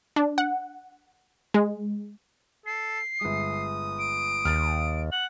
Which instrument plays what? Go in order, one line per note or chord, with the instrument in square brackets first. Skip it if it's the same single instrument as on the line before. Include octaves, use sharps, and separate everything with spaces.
[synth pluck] D4
F#5
G#3
[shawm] A4 [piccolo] C7
[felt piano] G1 G#3 [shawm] D#6
[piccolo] D7
[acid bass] D#2 [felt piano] F6 A6
[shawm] F#5 [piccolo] F#7